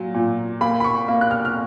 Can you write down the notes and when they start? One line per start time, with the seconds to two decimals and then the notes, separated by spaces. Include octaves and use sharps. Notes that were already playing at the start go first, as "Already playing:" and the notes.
Already playing: A#2 F#3
0.15 A#2
0.61 A#3 B5
0.80 B5
0.84 C#6
1.08 A#3
1.21 F#6
1.31 F6
1.45 F6